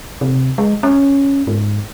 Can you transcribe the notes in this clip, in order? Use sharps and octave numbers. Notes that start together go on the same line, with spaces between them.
C3
G#3
C#4
G#2